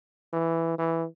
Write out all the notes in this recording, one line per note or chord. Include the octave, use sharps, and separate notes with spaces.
E3
E3